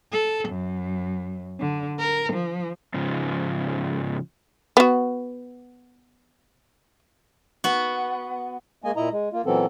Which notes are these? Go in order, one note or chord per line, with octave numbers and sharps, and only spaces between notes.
A4
F#2
D3
A#4
F3
G#2 C#3 F3
B3 F#4
B3 F#4
G#3 A#3 D#5 G#5
A#2 E4 D#5 A#5
G#3
A#3 F4
A#2 E3 F#3 B3 C4 A4